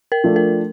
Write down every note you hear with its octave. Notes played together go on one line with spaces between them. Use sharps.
A#4
F3 A3 D4
A#4